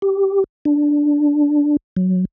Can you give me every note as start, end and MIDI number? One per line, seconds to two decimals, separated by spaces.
0.02 0.44 67
0.65 1.77 62
1.96 2.25 54